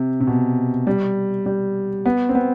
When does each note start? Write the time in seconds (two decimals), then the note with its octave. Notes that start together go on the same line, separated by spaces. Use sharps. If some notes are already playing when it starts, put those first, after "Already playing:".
Already playing: C3
0.20 C3
0.27 B2
0.87 G3
1.46 G3
2.05 B3
2.29 C4
2.35 B3